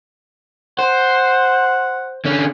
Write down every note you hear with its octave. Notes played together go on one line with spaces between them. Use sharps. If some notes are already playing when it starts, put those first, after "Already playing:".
C5 F#5
D3 C#4